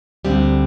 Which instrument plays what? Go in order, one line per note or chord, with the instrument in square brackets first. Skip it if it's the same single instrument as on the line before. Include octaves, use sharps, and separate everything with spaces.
[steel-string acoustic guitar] D2 D3 G3 C4